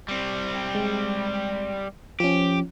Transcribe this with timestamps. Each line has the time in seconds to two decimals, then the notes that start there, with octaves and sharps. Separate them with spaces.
0.08 G3 C4
0.75 G#3
2.20 F3 C#4 G4